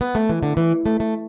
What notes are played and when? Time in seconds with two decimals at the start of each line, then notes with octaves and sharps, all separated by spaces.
0.01 B3
0.15 A3
0.29 E3
0.43 D3
0.57 E3
0.86 A3
1.00 A3